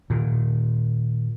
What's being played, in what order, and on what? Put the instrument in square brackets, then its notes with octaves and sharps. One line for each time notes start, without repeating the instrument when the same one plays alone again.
[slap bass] A#2 D#3